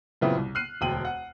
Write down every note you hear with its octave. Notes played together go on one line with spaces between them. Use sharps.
F#2 A#2 C#3 B3 C4 E4
C2
F6 F#6 C7 D#7
E1 D2 G5 D#7 F#7
F#5